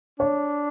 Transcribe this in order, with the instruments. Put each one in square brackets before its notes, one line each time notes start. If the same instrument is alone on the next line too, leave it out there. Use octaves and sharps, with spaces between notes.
[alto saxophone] D4 [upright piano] C#5